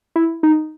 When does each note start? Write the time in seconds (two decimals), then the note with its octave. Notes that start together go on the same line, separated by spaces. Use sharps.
0.16 E4
0.43 D#4